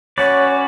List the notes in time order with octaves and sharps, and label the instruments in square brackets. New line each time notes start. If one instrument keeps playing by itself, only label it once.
[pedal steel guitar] C#4 F#4 B4 D5 [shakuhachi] C#5